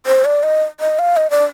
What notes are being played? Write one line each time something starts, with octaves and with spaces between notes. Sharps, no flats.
C5
D5
D#5
D#5
F5
D#5
D5